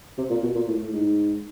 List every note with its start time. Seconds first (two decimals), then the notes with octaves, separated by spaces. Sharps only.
0.18 C3
0.30 A#2
0.43 B2
0.55 A#2
0.67 A2
0.82 A2
0.93 G#2